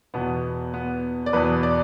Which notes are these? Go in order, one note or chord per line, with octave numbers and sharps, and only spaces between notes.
E2 B2 B3
B3
D5
E2 B2 B4
D5